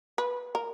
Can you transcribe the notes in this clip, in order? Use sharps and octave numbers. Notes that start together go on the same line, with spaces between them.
B4
A#4